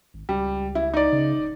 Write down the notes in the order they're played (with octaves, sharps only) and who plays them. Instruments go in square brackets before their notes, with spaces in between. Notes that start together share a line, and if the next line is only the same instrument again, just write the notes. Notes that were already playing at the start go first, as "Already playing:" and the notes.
[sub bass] G#1
[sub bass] C#2 [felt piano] G3
[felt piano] E4
D#4 D5
[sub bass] C#3
D1